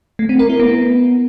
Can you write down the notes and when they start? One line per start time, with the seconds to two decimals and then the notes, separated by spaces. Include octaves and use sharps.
0.19 A3
0.29 C4
0.39 A#4
0.49 E4
0.60 B3